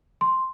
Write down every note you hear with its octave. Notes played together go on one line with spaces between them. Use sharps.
C6